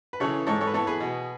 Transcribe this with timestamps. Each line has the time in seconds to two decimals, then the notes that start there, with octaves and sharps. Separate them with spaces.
0.13 B4
0.20 C#3 E3 A4 C#5
0.47 G#2 A4 C#5
0.61 A4 C#5
0.67 B4
0.73 E3 B3 A4 C#5
0.87 G#4 B4
1.01 B2